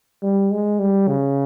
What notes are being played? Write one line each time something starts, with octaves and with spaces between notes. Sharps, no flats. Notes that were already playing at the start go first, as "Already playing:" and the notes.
G3
G#3
G3
C#3